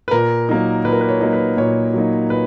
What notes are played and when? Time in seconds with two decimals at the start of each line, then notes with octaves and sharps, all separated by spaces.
0.08 B4
0.11 A#2 A#4
0.49 F#3 A#3 D#4
0.85 A#2 B4
0.92 A#4
1.01 B4
1.09 C#5
1.21 F#3 A#3 D#4
1.33 B4
1.57 A#2 C#5
1.94 F#3 A#3 D#4
2.30 A#2 B4